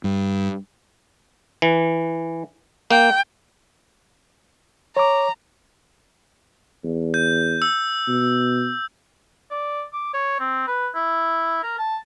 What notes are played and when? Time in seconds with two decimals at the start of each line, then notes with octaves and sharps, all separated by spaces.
0.04 G2
1.62 E3
2.91 A#3 G5
4.97 C#5 A#5 D6
6.84 E2
7.14 G6
7.62 E6
8.08 B2
9.50 D5
9.93 D6
10.14 C#5
10.40 C4
10.67 B4
10.95 E4
11.63 A#4
11.78 A5